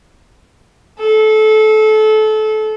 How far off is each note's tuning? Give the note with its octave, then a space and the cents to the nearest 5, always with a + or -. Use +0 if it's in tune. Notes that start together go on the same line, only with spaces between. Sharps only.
A4 -25